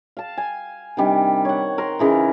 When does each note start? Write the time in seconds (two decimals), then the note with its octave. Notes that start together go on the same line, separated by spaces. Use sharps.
0.17 F5 A5
0.37 G#5
0.97 C3 D#3 G3 D4
1.45 C#5 F#5
1.78 A#4 C6
1.99 C#3 E3 D#4